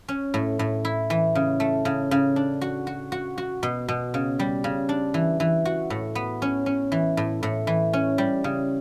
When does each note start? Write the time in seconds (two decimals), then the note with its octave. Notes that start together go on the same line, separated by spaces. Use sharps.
0.08 C#4
0.34 A2
0.59 A2
0.85 E4
1.10 E3
1.35 C#3
1.60 A3
1.85 C#3
2.11 C#3
2.36 D4
2.61 F#4
2.87 F#4
3.12 F#4
3.38 F#4
3.63 B2
3.89 B2
4.14 C#3
4.39 G3
4.64 C#3
4.89 D4
5.14 E3
5.40 E3
5.65 F#4
5.90 A2
6.15 B3
6.42 C#4
6.66 C#4
6.92 E3
7.17 A2
7.43 A2
7.67 E3
7.93 C#4
8.18 G3
8.44 C#3